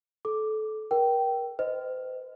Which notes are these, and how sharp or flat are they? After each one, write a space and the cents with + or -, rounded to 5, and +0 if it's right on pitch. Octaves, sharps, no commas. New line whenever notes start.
A4 -25 D6 +0
A#4 +30 G5 -15
C5 -35 D#5 +0